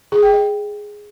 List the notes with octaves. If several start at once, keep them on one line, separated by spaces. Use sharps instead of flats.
G#4
G5
D#5